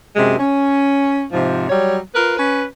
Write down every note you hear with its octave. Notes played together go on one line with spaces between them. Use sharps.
F#2 C3 G#3
C#4
G#2 C3 F3
F#3 G3 C#5
F4 A#4 B4
C#4 B4